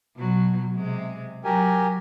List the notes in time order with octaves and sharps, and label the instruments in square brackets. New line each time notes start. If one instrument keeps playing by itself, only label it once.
[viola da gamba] B2 F#3
C3 G#3
[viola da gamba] F#3 [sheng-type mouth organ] G4 A#4 G#5